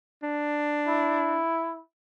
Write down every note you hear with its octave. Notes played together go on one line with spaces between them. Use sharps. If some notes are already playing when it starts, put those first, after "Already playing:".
D4
E4